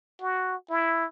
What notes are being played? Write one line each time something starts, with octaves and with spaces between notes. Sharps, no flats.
F#4
E4